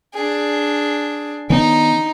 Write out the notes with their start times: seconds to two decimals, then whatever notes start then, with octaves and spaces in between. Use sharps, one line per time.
0.14 D4 G#4
1.50 D#3 B3 C#4 D#4